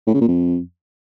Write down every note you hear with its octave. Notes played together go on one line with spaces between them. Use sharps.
A2
C#3
A#2
F2